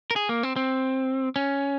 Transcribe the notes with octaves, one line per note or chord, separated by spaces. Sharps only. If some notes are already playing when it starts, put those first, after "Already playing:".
A#4
G#4
A#3
C4
C4
C#4